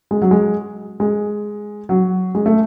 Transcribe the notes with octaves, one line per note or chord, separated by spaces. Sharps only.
G#3
F#3
G#3
G#3
F#3
G#3
A3